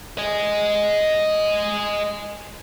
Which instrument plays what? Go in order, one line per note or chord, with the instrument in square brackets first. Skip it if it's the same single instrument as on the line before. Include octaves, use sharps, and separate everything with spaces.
[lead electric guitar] D#5 G#5